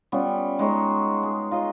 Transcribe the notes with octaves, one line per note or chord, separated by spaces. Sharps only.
G3 B3 C#4 F4
G#3 D#4 C#5
G#4
D#4 F4 D#5